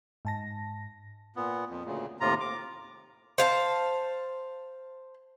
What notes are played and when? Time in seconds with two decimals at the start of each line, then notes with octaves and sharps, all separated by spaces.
0.25 G#2 A5 A#6
1.36 A#2 B3
1.70 F2
1.85 D2 A#2 C#3
2.20 D#2 A2 C3 F4 A#5
2.40 D6
3.38 C5 F5 A5